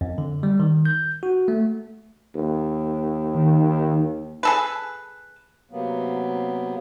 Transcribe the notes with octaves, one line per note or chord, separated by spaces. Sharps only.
F2
D3
G3
D#3
G6
F#4
A3
D#2
D#3
G#4 A4 B4
C3 F#3 A#3 B3